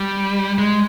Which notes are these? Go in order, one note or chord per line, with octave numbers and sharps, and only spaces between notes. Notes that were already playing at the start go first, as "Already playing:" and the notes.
Already playing: G3
G#3